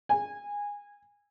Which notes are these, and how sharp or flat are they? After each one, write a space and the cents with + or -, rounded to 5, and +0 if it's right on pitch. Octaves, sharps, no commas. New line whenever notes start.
G#5 -20